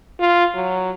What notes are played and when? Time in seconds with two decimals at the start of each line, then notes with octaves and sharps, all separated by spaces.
0.20 F4
0.54 F#3